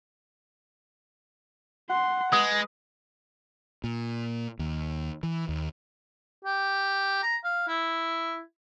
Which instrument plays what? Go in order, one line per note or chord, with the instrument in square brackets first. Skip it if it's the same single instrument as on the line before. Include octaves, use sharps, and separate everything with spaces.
[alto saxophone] F#5 [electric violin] C6
[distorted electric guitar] G#3 [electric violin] B4 [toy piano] D#6
[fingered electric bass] A#2
D#2
E3
D#2
[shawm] G4
A#5
F5
E4